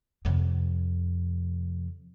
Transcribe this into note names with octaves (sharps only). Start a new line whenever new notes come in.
F2 C3